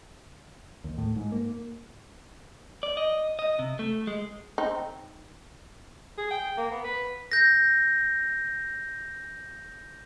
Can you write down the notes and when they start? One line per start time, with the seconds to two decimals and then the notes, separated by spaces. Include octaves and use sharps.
0.84 D#2
0.98 A2
1.16 G#2
1.32 A#3
2.83 D5
2.97 D#5
3.39 D#5
3.59 C3
3.79 A3
4.07 G#3
4.58 C4 D#4
6.18 G#4
6.31 G5
6.57 A#3
6.71 B3
6.84 B4
7.32 G6 A#6